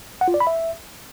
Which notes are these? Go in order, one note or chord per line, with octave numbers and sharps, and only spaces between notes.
F#5
F4
D5
B5
E5